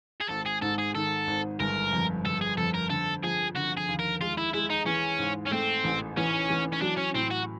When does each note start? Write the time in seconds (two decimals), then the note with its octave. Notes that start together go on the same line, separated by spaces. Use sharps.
0.21 G#4
0.29 G#1 A4
0.46 G#4
0.62 G#2 A4
0.78 G#4
0.95 D#3 A4
1.27 G#1
1.60 G1 A#4
1.93 F2
2.25 G1 A4
2.41 G#4
2.57 F2 A4
2.74 A#4
2.90 D3 A4
3.23 F3 G#4
3.55 D3 F#4
3.77 G#4
3.88 D#2
3.99 A#4
4.21 G#3 F4
4.37 E4
4.53 G#3 E4
4.70 D#4
4.86 E3 C#4
5.19 G#2
5.46 C#4
5.51 A3 C4
5.84 A1
6.17 E3 C#4
6.50 E3
6.73 C#4
6.82 F#3 D4
6.98 C#4
7.15 A2 C4
7.31 F#4